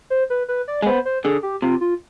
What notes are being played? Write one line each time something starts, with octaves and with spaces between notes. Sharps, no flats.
C5
B4
B4
D5
G#3
B3 C5
C5
D3 G#4
G4
C3 F4
F4